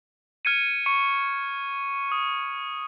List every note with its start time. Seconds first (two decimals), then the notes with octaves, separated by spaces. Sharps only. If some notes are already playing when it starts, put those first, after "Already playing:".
0.45 F6 G#6 C#7 D#7
0.86 C#6 C#7
2.12 D#6